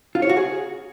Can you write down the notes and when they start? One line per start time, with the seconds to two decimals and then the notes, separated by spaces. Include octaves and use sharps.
0.15 F4
0.22 C#5
0.29 F#4
0.37 G#4